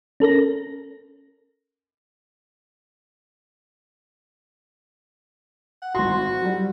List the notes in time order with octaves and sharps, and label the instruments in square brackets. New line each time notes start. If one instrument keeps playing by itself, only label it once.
[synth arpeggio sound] C#4 A4 A#4 A#6
[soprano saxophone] F#5
[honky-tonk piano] G#1 C6 [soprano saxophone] F#4
[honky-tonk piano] F#3 G3